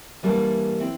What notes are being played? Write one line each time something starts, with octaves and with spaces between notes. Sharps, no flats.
E3 G3 A#3 D4
C4 E4